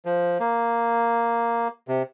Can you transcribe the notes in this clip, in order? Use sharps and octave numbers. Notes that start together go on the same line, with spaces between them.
F3
A#3
C3